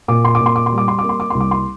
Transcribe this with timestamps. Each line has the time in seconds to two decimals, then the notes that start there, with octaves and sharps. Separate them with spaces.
0.08 A#2 D6
0.25 C6
0.35 D6
0.40 A#2
0.46 C6
0.56 D6
0.66 C6
0.72 G3
0.78 D6
0.88 C6
0.99 A#3 D6
1.09 C6
1.20 D6
1.30 C2 C6
1.40 D6
1.51 C6